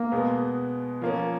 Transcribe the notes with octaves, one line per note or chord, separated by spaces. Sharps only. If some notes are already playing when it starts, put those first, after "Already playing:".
Already playing: A#3
B2 G#3 B3
F3 A#3 C#4